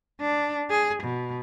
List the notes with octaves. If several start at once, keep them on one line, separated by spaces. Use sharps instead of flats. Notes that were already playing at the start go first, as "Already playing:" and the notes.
D4
G#4
B2